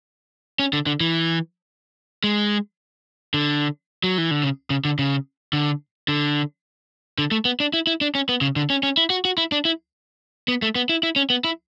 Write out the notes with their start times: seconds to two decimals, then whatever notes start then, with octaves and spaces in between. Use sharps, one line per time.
0.59 C#4
0.73 D3
0.86 D3
1.00 E3
2.24 G#3
3.34 D3
4.04 F#3
4.18 E3
4.31 D3
4.43 C#3
4.70 C#3
4.85 D3
4.99 C#3
5.53 D3
6.08 D3
7.18 D3
7.31 A3
7.45 B3
7.60 D4
7.73 E4
7.87 E4
8.01 D4
8.15 C#4
8.29 B3
8.41 C#3
8.56 D3
8.70 C#4
8.83 C#4
8.97 E4
9.10 F#4
9.25 F#4
9.38 E4
9.52 D4
9.65 E4
10.48 B3
10.62 A3
10.75 B3
10.89 E4
11.03 E4
11.16 C#4
11.30 B3
11.44 E4